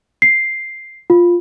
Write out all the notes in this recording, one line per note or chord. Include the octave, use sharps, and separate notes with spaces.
C7
F4